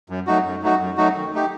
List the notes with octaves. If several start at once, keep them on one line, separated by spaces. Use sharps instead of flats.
F#2
F#3 A3 D#4 F#4
F#2
F#3 A3 D#4 F#4
F#2
F#3 A3 D#4 F#4
D#3
A3 D#4 G4